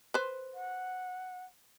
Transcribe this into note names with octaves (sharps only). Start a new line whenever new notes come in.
B4 C5
F#5